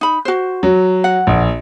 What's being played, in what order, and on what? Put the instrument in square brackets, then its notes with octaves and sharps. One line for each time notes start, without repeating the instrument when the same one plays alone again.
[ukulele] D#4 B5
F#4 C5
[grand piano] F#3
[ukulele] F#5
[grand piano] A#1